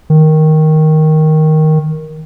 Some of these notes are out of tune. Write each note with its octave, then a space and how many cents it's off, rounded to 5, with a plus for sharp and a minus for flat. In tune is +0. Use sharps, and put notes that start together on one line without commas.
D#3 +5